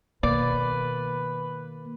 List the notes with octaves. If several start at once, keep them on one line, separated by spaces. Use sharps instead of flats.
B2 D#3 A#3 B4 D5